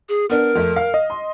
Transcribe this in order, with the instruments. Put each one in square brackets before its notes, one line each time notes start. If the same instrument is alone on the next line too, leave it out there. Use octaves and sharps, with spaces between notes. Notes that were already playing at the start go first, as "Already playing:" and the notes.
[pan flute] G#4
[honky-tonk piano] B3 D4 [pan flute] A#4
[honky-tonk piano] F2 A3
F5
[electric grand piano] D#5
[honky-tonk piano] C6